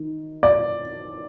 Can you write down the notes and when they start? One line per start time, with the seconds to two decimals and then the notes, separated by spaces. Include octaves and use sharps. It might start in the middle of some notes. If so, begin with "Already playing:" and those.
Already playing: D#3
0.43 D5